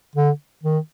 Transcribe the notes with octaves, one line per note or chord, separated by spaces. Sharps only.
D3
D#3